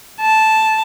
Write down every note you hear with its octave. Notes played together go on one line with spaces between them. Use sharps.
A5